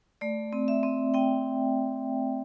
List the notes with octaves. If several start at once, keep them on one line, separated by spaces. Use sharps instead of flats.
A3 D5
C4
E5
C4
C4 G5